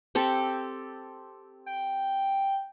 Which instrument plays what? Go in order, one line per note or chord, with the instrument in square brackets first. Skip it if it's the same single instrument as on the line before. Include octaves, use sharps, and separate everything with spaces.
[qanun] C4 G4 A4
[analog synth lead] G5